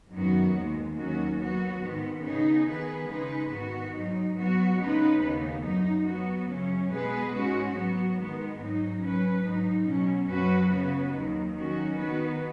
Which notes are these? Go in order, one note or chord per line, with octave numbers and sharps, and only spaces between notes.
F#2 D#3 F#3 B3 F#4
D#2 D#3 G#3
D#2 D#3 F#3 C#4 F#4
F#3 B3 F#4
G#2 D#3 B3
C#3 B3 D#4 G#4
D#3 B3 G#4 B4
C#3 G#3 D#4 G#4 B4
G#2 D#3 B3 F#4
G#2 F#3 D#4
F#3 B3 F#4
C#3 G#3 B3 D#4 B4
D#2 C#3 B3 D#4
F#2 F#3 D#4
F#3 B3 F#4
F#2 C#3 F#3 C#4
B2 G#3 B3 G#4 B4
G#2 G#3 C#4 F#4
F#3 B3 F#4
D#3 G#3 B3
G#2 F#3 D#4
F#3 C#4 B4
G#2 F#3 D#4
B2 F#3 C#4
F#2 F#3 C#4 F#4 B4
C#3 B3 F#4 B4
D#2 D#3 F#3
D#3 F#3 C#4 F#4
D#3 B3 F#4 B4